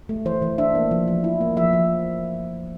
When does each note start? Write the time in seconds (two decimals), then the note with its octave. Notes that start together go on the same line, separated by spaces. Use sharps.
0.09 A3
0.25 E3 C5
0.42 E3
0.58 D4 E5
0.75 A#3
0.91 F3
1.08 F3
1.24 E4
1.41 A#3
1.57 F3 E5
1.73 F3